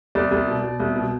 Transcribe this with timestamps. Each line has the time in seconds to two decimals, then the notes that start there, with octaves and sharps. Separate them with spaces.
0.15 C2 D5
0.31 C2
0.47 B2
0.64 B2
0.80 C2
0.96 B2